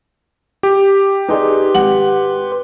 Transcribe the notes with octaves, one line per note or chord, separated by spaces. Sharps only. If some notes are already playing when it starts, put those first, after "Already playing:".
G4
D#4 G#4 B4 D5 C6
G#1 F#5 F#7